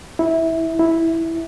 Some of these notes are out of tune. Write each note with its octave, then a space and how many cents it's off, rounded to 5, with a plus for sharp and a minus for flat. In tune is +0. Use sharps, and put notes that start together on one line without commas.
E4 -15
E4 -5